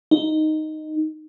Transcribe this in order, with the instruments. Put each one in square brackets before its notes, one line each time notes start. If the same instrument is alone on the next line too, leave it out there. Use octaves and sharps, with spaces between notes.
[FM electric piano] D#4